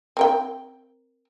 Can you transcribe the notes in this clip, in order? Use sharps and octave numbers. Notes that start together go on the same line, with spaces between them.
C4 A#4 G5